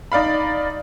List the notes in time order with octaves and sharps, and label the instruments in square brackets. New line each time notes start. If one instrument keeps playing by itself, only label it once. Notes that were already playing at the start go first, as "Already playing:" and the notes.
[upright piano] D#4 D5 F5 B5